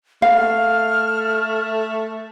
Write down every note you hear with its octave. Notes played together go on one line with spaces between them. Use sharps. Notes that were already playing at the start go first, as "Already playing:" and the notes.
A3 F5 F6